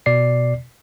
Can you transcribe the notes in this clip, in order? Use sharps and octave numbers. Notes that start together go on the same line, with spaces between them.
B2 D5 C7